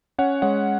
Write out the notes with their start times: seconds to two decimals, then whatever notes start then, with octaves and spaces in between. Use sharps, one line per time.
0.18 C#4 C#5 F#5
0.42 G#3 C#5 F#5